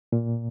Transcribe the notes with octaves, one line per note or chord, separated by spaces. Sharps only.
A#2